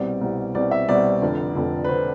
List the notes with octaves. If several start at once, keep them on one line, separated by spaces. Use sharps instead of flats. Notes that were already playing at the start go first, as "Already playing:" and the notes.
Already playing: C2 B2 G3 C4 D5
C2 B2 G3 C4
C2 B2 G3 C4 D5
E5
C2 B2 G3 C4 D5
F1 F2 D3
F1 F2 D3
B4
D3 C5